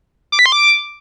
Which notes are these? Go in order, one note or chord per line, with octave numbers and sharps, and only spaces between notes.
D6
B6
C6
D6